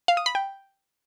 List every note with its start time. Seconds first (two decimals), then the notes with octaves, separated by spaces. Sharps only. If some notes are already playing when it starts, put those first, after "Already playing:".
0.08 F5
0.17 D#6
0.26 B5
0.35 G5